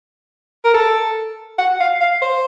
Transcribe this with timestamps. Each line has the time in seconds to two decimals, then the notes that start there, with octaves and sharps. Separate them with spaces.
0.65 A#4
0.74 A4
1.58 F#5
1.80 F5
2.01 F5
2.22 C5